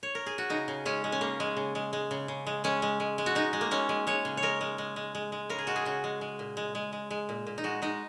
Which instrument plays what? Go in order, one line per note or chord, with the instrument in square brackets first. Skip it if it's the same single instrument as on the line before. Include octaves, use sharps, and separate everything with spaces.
[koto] C#5
A#4
G#4
F#4
C#3 D#4
C#3
G#3 C#4
G#3
C#4
C#3 A#3
G#3
C#3
G#3
G#3
C#3
C#3
G#3
G#3 C#4
G#3
G#3
G#3
F#4
G#3 D#4
G#3
A#3
G#3 C#4
G#3
G#3 C#5
C#3
C#5
G#3 A#4
G#3
G#3
G#3
G#3
G#3
C#3 A#4
G#4
G#3 F#4
G#4
C#3 F#4
G#3
G#3
A#2
G#3
G#3
G#3
G#3
A#2
A#2
D#4
G#3 F#4
G#3 D#4